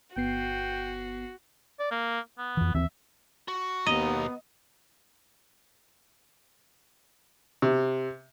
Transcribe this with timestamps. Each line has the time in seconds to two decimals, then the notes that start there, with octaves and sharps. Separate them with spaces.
0.16 G1 B3 F#4 G5 C7
1.79 D5
1.91 A#3
2.38 B3
2.57 F2 E3
2.75 D#2 E3 C4 E5
3.48 F#4
3.86 D#2 B2 B3 D#5 A#5
7.62 C3